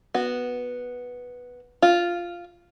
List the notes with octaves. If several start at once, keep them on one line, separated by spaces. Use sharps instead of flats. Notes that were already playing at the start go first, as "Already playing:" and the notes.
B3 F#4
F4